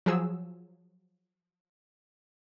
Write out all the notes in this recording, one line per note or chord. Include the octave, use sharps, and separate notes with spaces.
F3 F#3 G#4 E6